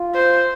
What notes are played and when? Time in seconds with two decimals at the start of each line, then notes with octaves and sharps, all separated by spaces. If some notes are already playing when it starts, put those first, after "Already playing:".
Already playing: F4
0.14 C5